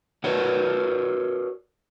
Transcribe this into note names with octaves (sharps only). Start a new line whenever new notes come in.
F#4 A#4 B4 C#5 D5 F#5